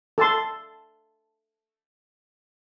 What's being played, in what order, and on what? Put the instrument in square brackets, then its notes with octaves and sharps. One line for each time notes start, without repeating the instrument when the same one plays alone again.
[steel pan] A4 A5 C6